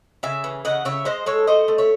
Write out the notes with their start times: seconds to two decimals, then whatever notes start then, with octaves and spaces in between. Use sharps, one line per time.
0.23 C#3 E5 G#5
0.44 E3
0.65 C#3 D#5 F#5
0.85 C#3 C#5 E5
1.05 G#3 C5 D#5
1.26 G#3 A4 C#5
1.47 A3 C5 D#5
1.68 A3
1.78 C#5 E5